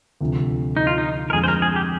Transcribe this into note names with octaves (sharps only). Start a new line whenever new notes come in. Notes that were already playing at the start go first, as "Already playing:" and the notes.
D2 C3 F3
D#4
F4
D#4
A#4
F2 D3 G#3 G#4
C5
A#4
G#4
G4